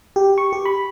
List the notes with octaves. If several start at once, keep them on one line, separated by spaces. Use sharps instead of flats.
G4
C#6
G4
B5